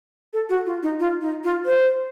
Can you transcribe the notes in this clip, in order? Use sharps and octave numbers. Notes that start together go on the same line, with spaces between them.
A4
F#4
F4
D#4
F4
D#4
F4
C5